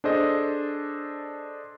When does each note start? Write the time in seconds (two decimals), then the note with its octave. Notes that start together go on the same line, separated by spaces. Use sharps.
0.04 D4 G#4 A4 C5 D#5